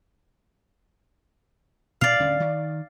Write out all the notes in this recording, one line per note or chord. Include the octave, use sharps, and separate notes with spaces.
A#2 D5 F5
D1 D3 C#4
D#3